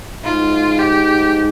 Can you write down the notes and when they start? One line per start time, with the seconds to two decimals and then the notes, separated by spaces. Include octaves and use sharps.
0.24 G#2 F4
0.79 G4